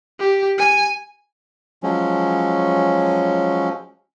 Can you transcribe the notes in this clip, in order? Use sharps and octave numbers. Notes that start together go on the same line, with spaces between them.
G4
G#5
F3 F#3 G#3 C#4